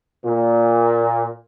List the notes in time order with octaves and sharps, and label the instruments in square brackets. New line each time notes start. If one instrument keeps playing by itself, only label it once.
[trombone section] A#2